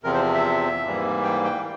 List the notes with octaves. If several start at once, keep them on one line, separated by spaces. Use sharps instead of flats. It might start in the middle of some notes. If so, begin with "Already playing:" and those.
E2 C3 F3 C4 A#4
C5
E5
G#2 E3 G3 A#3
G5
G5